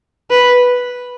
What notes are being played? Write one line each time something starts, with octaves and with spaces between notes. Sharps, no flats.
B4